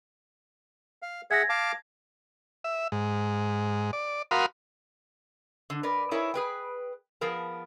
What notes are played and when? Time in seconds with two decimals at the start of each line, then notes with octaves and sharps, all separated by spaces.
1.02 F5
1.31 G#4 E5 F#5 G#6 A#6
1.49 F5 A5 D6
2.64 E5
2.92 G#2
3.93 D5
4.31 F#4 A#4 F5 B5 C6 D#6
5.70 D3
5.83 A#4 B4 D5
6.11 D#4 E4 G#4 A#4 C#5 E5
6.34 G#4 B4 G5
7.21 F3 B3 G#4 A#4 A5